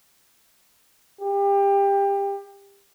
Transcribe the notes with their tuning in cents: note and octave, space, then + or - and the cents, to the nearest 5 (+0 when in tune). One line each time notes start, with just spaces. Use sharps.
G4 +25